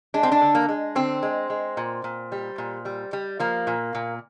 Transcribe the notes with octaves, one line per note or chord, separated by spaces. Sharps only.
G#3 D4
C4
D4
D3
A#3
G#3
D3 C4
G#3
G#3
A#2
A#2
G3
A#2
G3
G3
F3 A#3
A#2
A#2